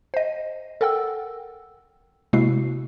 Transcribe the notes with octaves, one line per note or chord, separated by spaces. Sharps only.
C5 D#5
A4 A#4 F#5 G5 E6
C3 G#3 A#3 E4 F#4 C7